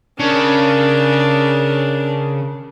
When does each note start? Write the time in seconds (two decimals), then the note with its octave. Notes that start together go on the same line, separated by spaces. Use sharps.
0.19 C#3 D4 A#4